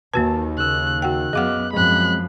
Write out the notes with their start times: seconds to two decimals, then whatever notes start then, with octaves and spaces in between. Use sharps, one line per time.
0.14 D#2 D#3 A#3 F#4 B4 A5
0.58 C#3 E6 F#6
1.02 F#4 F#5 G5 F#6
1.33 F#2 B3 G#4 D#5 F5 F#5 D6 F6
1.73 F#2 F3 G#3 C4 B5 F#6